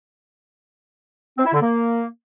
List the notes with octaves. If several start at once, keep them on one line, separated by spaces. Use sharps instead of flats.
C4
E4
D3
A#3